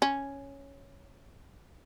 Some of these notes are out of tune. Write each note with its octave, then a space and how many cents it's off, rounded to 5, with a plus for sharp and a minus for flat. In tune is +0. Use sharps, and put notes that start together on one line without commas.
C#4 +0